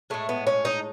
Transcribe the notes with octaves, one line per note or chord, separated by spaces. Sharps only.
A2 G#3 A3
B3
C#4
D#4